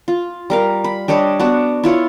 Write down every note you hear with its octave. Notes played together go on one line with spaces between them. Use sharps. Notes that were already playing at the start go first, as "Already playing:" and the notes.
F4
G3 A#4 F5
B5
G3 D4 C#5 D#5
B3 D4 F#4
E4 F4 C#5